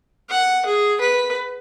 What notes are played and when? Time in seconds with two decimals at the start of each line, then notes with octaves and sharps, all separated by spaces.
0.30 F#5
0.66 G#4
1.01 B4